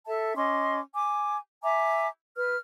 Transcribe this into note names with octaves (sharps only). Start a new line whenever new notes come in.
A4 E5 A5
C#4 D#5 C6 D6
G#5 D6
E5 G#5 A#5 D6
B4 F6